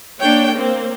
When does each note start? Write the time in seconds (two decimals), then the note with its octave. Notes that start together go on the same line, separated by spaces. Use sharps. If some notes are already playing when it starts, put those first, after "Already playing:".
0.20 A#3 D4 C#5 G5
0.54 A#3 C4